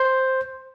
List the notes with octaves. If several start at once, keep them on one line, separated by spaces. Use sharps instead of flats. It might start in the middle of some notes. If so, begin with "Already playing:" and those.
Already playing: C5